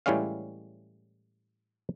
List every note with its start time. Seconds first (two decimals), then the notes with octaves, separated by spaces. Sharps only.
0.06 A2 E3 G3 G#3 C#4 F5